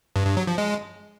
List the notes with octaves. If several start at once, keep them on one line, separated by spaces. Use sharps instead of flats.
G2
G2
F#3
F3
G#3